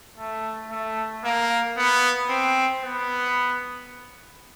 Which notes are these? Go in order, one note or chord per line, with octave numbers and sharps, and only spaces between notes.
A3
A3
A#3
B3
C4
B3